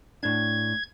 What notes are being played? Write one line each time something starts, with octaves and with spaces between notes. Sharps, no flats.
A2 D4 G#6